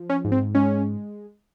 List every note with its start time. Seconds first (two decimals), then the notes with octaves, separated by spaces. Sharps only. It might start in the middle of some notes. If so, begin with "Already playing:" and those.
Already playing: F3
0.10 C#4
0.25 G#2
0.32 C4
0.55 G#3 C#4